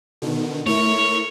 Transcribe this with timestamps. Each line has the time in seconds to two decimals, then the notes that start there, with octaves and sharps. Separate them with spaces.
0.22 B2 D3 D#3
0.66 A3 E4 A#4 C#5